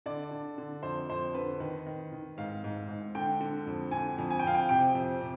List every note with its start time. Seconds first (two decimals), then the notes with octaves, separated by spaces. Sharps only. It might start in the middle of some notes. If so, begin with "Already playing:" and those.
0.06 D3 D5
0.31 D3
0.58 D3
0.83 F2 C5
1.10 F2 C5
1.34 D3 B4
1.60 D#3 B4
1.87 D#3
2.12 D#3
2.38 G#2 F5
2.64 G#2
2.89 G#2
3.15 D3 G5
3.41 D3
3.66 F2
3.91 D3 G#5
4.18 F2
4.30 G#5
4.39 G5
4.44 F2 F5
4.55 G5
4.69 C3 G5
4.95 F2
5.21 C3